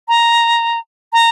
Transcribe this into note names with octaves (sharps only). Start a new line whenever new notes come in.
A#5
A#5